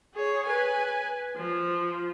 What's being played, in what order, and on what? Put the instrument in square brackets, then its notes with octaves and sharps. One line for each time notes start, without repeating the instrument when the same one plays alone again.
[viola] G#4 C#5
B4 G#5
F3